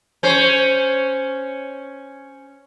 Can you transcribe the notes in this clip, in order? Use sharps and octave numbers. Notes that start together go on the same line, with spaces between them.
C#4 C5